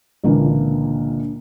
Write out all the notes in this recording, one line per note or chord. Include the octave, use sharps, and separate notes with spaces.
C#2 A#2 D3 E3 A#3